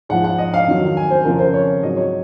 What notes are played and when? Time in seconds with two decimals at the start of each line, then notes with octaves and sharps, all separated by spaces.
0.09 G#2 F3 F#5
0.24 F#5
0.38 D#5
0.54 F5
0.67 F2 D#3 F#3
0.97 G#5
1.10 C5
1.25 F2 C#3 F3 A#4
1.39 C5
1.54 C#5
1.82 G#2 F#3 D#5
1.97 C#5